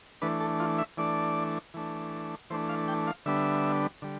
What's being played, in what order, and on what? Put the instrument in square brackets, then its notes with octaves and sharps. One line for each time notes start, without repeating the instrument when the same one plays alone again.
[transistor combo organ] E3 A3 D4 B4
A4
F4
E5
E3 A3 D4 D5
E3 A3 D4
E3 A3 D4 C5
F5
G5
F5
D3 G3 B3 D4 E5
D3 G3